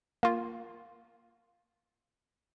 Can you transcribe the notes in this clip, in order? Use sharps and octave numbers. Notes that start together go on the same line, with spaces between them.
A#3 F4